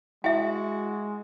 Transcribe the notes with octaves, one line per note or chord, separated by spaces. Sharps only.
G#3 E4 F#4 E5 G#5